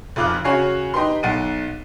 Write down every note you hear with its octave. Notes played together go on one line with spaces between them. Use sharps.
F1 F2 F4 D6 F6 F#6
C#3 F#4 C#5 G#5 C7
D#4 G4 B4 C6
B1 F#5 A6 C7 D7 D#7